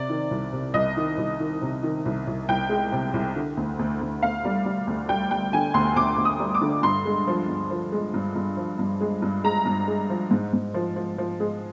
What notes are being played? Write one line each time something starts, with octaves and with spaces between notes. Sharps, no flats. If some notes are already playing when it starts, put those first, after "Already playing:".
Already playing: C3 D5
D#3
C2
C3
C2 D#5
D#3
C2
D#3
C3
D#3
C2
C2
C2 G5
G#3
C3
C2
D3
D2
D2
D2
D2 F5
G3
G3
D2
G3 G5
G3 G5
D3 G#5
D2 C6
D2 D6
D2
D#6
G3
D6
D3
G2 C6
G#3
F3
G2
F3
G#3
G2
G2
F3
G2
G#3
G2
G#3 A#5
G2
G#3
F3
G#2
G#2
F3
F3
F3
G#3